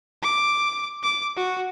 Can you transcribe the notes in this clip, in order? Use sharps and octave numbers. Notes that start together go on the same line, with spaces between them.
D6
D6
F#4